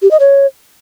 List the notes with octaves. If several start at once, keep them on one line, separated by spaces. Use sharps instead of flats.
G4
D#5
C#5